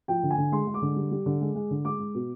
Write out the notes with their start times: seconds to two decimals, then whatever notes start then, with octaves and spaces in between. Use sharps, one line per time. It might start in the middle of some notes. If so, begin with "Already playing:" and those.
0.08 F3 G5
0.23 D3
0.31 G#5
0.37 D3
0.52 G#3 C6
0.67 G#3
0.74 D6
0.82 D3
0.96 G3
1.11 G3
1.26 D3
1.41 G#3
1.55 G#3
1.70 D3
1.85 G#3 D6
2.00 G#3
2.14 B2